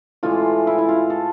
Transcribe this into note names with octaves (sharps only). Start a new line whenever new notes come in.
A2 E3 G#3 F4
E4
E4
F4
A4